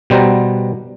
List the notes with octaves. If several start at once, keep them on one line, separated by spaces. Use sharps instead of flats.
B2 G3 C5 F#5 A#5